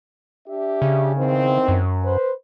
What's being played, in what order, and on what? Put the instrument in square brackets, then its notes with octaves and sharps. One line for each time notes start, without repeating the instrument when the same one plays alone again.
[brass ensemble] D4 G4 E5
[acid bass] C#3
[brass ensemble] E2 D#3 C4
[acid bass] F#2
[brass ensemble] B4 C5